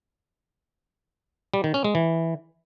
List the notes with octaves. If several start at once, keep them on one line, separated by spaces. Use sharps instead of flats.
G3
D#3
C#4
G#3
E3